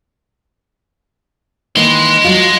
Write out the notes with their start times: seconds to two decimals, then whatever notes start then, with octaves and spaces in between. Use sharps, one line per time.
1.76 D#3 E3 A#3 D#5 C6
2.24 F#3 F4